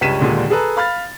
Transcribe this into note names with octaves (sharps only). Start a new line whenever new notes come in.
C#2 G2 C#4 B6 D#7 E7
D#2 A#2 D3 G#3
G#4 A4 B4 A#5
F5 B5 F6 A6